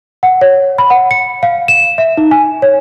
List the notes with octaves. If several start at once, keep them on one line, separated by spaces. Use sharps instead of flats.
F#5
C#5
B5
F#5
C#7
F5
E7
E5
D#4
G#5
C#5